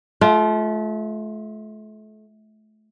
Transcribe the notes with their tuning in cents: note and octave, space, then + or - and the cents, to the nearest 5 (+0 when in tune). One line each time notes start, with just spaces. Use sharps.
A3 -35 F4 +0